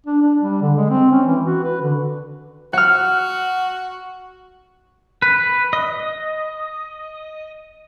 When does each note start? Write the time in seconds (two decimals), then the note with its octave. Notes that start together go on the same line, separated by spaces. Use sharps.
0.06 D4
0.22 D4
0.40 G3
0.62 D3
0.77 G#3
0.90 C4
1.12 C#4
1.27 E3
1.46 F#4
1.64 B4
1.82 D3
2.73 F#4 F#5 F6
5.22 B4
5.73 D#5